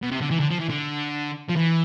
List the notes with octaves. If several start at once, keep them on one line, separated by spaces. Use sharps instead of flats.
B2
C3
D3
E3
D3
F3
E3
D3
F3
E3